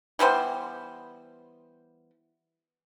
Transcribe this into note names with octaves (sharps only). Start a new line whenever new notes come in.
E3 G3 B3 C5